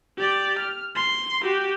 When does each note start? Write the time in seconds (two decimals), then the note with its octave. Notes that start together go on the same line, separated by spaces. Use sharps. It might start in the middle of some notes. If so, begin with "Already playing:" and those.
0.17 G4 D5
0.58 F6
0.95 C6
1.42 F#4 G4